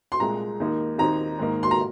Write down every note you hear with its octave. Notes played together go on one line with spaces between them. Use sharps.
C6
C2 A#2 G#3 A#5
D#2 D#3 A#3 D#4
D#2 D#3 C4 D#4 A#5
G#2 D#3 A#3 D#4
C6
A#5